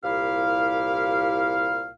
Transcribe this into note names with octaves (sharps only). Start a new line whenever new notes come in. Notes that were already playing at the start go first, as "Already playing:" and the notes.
C2 A#2 E4 G4 F5